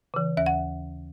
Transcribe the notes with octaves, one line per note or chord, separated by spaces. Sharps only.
C#3 E3
D#2 E5
F#5